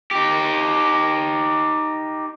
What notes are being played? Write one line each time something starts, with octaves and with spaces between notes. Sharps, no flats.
D#4 G4